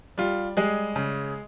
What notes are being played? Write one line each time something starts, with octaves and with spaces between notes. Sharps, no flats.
G3 F4
G3 G#3 G#4
C#3